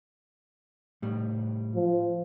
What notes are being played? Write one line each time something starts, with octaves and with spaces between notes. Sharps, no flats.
A2 G3
F3